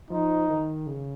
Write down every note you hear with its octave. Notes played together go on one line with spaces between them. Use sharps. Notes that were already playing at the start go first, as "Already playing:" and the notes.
F3 D#4
D#3
C#3